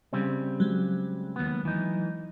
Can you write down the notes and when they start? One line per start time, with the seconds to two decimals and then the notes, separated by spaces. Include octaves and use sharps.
0.13 C#3 G3 C4
0.60 F#3 G#3
1.36 D#2 B3
1.65 E3 D#4